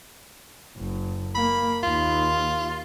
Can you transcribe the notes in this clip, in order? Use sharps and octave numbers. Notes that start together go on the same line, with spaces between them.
F#1
A#3 B5
D#2 F4